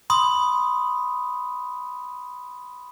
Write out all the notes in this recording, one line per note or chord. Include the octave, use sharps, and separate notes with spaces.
B5 C6 D#6